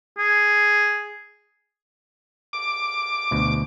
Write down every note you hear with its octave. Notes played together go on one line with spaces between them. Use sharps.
G#4
D6
D2 B2